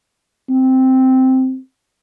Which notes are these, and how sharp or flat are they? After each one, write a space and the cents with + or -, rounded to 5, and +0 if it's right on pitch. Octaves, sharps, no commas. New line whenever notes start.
C4 -5